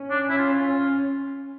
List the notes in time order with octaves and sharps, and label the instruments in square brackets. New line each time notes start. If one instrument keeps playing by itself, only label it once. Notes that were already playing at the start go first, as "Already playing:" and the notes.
Already playing: [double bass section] C#4
[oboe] D4
E4
F4